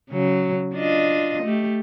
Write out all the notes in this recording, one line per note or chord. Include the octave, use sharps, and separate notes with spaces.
C#3 F#3
D4 F4 D#5
A3 G4